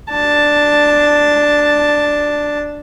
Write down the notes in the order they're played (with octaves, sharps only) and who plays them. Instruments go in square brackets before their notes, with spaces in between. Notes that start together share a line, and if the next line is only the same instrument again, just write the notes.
[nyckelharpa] D4 A5